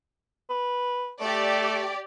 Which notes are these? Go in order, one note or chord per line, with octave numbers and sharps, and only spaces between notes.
B4
A3 G4 D5